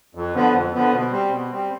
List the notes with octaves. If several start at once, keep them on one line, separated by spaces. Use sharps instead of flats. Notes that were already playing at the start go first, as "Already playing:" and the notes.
F2
D3 F3 B3
F2
D3 F3 B3
B2
G3 C4
B2
G3 C4